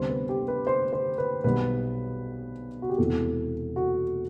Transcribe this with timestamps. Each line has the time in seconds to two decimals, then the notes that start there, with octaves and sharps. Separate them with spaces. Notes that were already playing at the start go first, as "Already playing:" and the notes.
Already playing: D2 C3 G3 B3 C5
0.09 B4
0.29 G4
0.48 B4
0.67 C5
0.93 C5
1.18 B4
1.44 B1 B2 G3 B3 B4
2.82 F#4
2.89 G4
2.98 E1 E2 C3 E3 A4
3.76 F#4